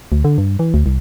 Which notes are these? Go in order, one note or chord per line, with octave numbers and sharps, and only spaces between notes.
D2
D3
G2
E3
D2
C2